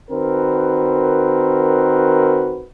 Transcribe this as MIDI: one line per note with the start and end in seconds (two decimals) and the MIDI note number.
0.11 2.66 51
0.11 2.66 60
0.11 2.66 66
0.11 2.66 70
0.11 2.66 71